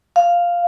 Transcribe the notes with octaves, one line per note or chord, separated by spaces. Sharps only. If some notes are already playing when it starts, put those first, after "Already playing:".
F5